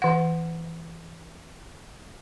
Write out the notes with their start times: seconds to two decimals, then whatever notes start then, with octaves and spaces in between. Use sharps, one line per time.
0.02 E3 F#5